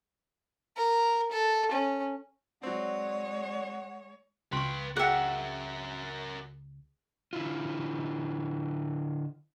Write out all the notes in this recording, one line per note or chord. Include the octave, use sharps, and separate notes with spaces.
A#4
A4
C#4
F#3 G#3 C4 C#5 D5 F#5
C#2 B4 G5 C6 C#6
F#4 G#4 A#4 E5 F#5 G5
D3 E4 F4